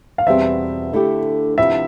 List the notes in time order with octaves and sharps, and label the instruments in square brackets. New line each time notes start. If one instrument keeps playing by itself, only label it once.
[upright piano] F5
[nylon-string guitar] E2 B2 G3 C4 [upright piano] E5
[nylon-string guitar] D3 A3 E4 G4
[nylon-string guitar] D2 C3 F3 B3 E4 [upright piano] E5